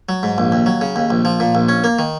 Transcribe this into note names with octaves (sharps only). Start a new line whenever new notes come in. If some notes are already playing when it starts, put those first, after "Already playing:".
F#3
G#2
A#1
D#2
F#3
C#3
D#2
A#1
F3
A#2
A#1
C#4
A#3
D#3